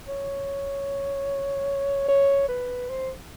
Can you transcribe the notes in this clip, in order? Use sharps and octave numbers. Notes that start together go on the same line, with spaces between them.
C#5
C#5
B4
C5